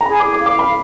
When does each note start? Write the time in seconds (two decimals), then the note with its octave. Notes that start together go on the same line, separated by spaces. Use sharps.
0.01 A#5
0.06 G#4 B5
0.20 G#4 D6
0.33 D6
0.41 F5
0.46 D6
0.59 F5 B5